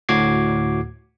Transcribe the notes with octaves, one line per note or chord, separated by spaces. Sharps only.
D2 A2 F#4 D6 G#6 C7